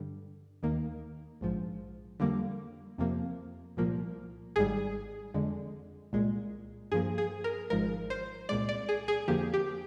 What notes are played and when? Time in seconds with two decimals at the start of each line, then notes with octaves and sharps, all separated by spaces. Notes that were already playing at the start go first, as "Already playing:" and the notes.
Already playing: G2 D3 G3
0.63 D#2 D#3 A#3
1.41 A#1 G#2 F3
2.20 F2 D3 G3 A#3
2.98 F2 C3 F3 A#3
3.77 C2 A#2 F3 A#3
4.56 G#1 G#2 G3 G#4
5.34 F2 D3 G#3
6.13 C2 A#2 G#3
6.92 G2 F3 A#3 G#4
7.18 G#4
7.44 A#4
7.70 G#1 G#2 F3 G#3 A#4
8.10 C5
8.49 C2 A#2 G#3 D5
8.69 D5
8.89 G#4
9.08 G#4
9.28 F2 D3 F3 A#3 G4
9.54 G4